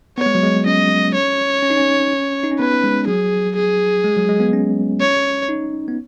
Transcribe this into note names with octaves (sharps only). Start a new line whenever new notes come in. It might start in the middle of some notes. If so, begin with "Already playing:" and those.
B3 C#5
G#3
F#3
G#3
C#4 D#5
C#5
C#4
D#4
C#4
D#4
C#4
B3 B4
G#3
F#3 G#4
G#4
G#3
F#3
G#3
B3
C#4
C#5
D#4
B3